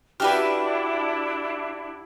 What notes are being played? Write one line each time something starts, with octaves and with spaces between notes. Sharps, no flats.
D4 E4 F#4 G4 B4 E5 F6